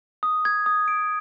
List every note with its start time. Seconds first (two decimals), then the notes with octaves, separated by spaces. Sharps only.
0.23 D#6
0.45 G#6
0.66 D#6
0.88 D7